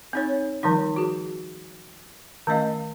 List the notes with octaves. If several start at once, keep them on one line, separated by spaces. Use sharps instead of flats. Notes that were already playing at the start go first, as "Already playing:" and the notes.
C4 D#4 C#5
D#3 F3 G3 D#4
F#4 G#4
D#3 A3 C#4 D#5 F5